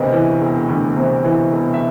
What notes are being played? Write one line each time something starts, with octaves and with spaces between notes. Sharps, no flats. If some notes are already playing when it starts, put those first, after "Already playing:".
Already playing: E1 D2 C3 A#4 B4 D#5
E3
E1
D2
C3
E3
E1
E5